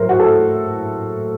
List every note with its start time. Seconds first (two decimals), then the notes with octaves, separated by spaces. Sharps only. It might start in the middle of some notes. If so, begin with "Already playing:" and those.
Already playing: A2 F#3 A#4 C5
0.09 F#4
0.19 A4